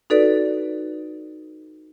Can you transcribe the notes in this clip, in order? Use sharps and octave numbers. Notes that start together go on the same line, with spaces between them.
D#4 F#4 A4 B4 D5